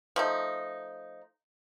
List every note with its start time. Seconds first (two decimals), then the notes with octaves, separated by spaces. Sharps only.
0.16 F3 A3 D#4